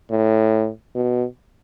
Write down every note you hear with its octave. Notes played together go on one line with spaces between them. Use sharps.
A2
B2